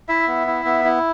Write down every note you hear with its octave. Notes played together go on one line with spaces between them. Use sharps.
E4 E5
B3
E4
B3
E4